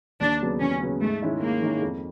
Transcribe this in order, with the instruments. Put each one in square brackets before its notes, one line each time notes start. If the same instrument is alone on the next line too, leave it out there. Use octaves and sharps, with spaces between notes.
[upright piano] D#2 [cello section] D4
[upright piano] C#3 F#3 B3
[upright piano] D#2 [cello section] C#4
[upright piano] C#3 F#3 B3
[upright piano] G#2 [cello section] A3
[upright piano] D#3 G#3 C#4 E4
[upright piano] G#2 [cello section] A#3
[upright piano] D#3 G#3 C#4 E4
F2